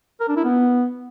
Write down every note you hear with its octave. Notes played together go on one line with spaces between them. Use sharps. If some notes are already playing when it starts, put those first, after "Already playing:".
A#4
D4
E4
B3